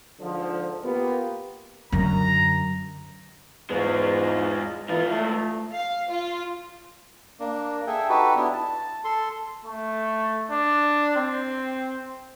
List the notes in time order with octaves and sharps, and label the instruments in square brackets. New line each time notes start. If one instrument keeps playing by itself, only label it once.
[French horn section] G#2 D3 F3
A#3 B3 F4 G4
[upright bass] F#2 D3 [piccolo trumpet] A#5
[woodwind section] E2 G#2 [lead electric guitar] G#3 F4
[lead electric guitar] G#2 F4 [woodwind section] E3
[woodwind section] A3
[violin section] F5
F4
[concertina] A#3 D4
G#4 A4 E5 G5
D#4 F#4 G4 A4 B4
B3 D4 E4
A5
A4 C6
[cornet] A3
D4
C4